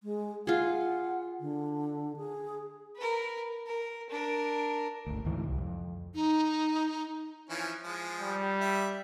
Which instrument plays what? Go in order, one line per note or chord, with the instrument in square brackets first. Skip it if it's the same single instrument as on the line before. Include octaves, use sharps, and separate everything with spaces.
[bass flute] G#3
[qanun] F4 G#4 [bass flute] F#5
[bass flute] D3
G#4
[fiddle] A#4 B4
A#4
D4 A#4
[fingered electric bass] G1 D2
D2 G#2 E3
C2
F2
[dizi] D#4
[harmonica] E3 F3 C#4
F3 G#3
[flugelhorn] G3
[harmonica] E5